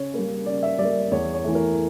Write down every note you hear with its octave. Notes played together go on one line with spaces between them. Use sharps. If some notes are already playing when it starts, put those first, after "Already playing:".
Already playing: C#3 C#5
G3 A#3
C#3 D5
E5
G3 D5
A#3
E2 C#5
C#5
E3 A3
A#4